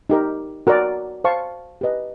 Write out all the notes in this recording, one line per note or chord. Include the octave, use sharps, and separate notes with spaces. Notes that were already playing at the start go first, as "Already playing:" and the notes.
D#4 G4 A#4
F#4 A#4 D5
C5 F5 A5 C#6
G4 B4 D#5